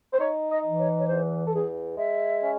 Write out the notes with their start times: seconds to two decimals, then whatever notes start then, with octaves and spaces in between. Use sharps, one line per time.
0.13 C5
0.20 D#4 C#5
0.50 D#5
0.64 E3
0.79 C#5
0.98 C#5
1.08 E2 C5
1.46 A4
1.53 E2 G#4
1.97 G#3 E5
2.41 C#4